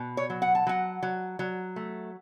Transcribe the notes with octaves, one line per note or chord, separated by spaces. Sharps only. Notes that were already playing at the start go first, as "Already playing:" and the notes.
Already playing: B2
C#5
F#3
F#5
A5
F#3 F#5
F#3
F#3
A3